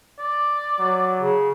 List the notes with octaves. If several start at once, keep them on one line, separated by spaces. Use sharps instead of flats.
D5
F#3
C#3